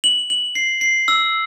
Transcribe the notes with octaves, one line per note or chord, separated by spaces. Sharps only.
F#7
F#7
C7
C7
E6